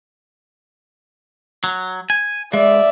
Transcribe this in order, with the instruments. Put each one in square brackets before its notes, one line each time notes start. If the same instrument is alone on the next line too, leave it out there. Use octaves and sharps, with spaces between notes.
[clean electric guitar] F#3
G#5
[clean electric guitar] G#3 [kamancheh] D5 E5